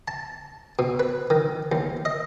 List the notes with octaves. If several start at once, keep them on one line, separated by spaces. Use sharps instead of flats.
A5
B2
B4
D#3
D#2
D#5